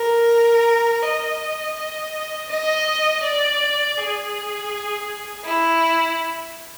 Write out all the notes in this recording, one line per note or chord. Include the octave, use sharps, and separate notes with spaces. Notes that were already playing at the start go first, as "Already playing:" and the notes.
Already playing: A#4
D#5
D#5
D#5
D5
G#4
E4